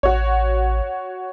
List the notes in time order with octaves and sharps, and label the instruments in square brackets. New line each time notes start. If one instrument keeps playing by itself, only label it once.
[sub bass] A1 [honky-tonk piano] F#4 C#5